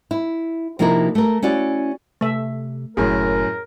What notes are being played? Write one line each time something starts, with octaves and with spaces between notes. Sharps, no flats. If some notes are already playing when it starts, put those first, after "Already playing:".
E4
C3 F3 A#3 D#4 E4 A#4
A3 A#4
C#4 E4 F#4 D5
C3 A3 E5
F#1 F#2 A2 G#4 A#4